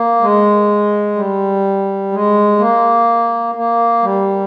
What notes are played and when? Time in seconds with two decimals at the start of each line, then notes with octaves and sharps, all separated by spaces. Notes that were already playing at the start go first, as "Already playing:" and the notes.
Already playing: A#3
0.21 G#3
1.16 G3
2.12 G#3
2.59 A#3
3.55 A#3
4.02 G3